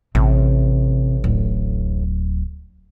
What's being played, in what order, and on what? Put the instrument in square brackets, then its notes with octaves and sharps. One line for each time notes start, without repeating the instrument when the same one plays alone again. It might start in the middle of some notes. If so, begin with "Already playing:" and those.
[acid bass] A1 [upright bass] C3
[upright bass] D1